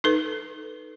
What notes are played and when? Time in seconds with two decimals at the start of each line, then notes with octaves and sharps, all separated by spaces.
0.04 D#4 A4 B4